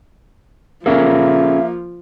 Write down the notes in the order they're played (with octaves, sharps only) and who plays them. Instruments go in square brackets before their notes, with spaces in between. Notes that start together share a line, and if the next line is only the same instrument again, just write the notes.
[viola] F3 [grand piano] A#3 [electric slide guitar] C#4 G#4 A4 [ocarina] E5